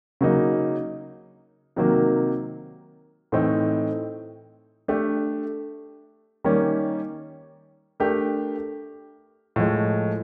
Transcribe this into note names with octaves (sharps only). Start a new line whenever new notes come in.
C#3 F#3 A#3 D#4
C3 D#3 F#3 A#3
A2 E3 A3 C4 D#4
A3 D4 G4
D#3 G3 A#3 C#4
A3 D4 G4 A#4
A2 F3 G#3